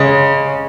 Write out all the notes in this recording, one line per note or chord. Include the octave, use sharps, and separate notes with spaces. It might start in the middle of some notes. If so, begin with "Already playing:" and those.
Already playing: C#3 G#3